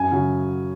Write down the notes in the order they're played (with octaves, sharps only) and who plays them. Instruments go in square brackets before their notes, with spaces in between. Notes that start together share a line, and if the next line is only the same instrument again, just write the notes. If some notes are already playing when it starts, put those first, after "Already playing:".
Already playing: [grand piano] F#2 G#5
C#3 F#3